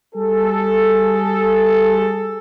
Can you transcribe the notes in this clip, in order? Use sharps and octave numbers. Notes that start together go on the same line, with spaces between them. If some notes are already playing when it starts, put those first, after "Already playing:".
G3 G#4 A4